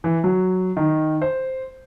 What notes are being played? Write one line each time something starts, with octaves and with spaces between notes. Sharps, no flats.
E3
F#3
D#3
C5